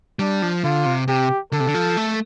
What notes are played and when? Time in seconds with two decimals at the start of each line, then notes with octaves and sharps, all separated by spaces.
0.19 G3 D4
0.42 F3
0.64 D3 F4
0.86 C3
1.08 C3 G4
1.52 D3 A4
1.60 C3
1.67 D3
1.74 F3
1.97 A3